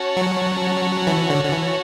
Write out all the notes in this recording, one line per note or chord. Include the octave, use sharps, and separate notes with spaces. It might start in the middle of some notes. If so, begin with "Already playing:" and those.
Already playing: C#4 F#4 C#5 F#5 A5
F#3
E3
D3
D3
E3